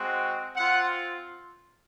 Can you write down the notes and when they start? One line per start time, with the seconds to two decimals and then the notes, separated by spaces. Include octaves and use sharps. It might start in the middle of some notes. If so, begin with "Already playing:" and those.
Already playing: G#3 C4 F#4
0.56 C4 F4 F#5